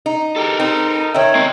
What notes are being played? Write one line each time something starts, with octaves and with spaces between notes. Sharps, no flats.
D#4
G4 A4 A#4
C4 D#4
D#3 D#4 C#5 E5 G5
C4 A#4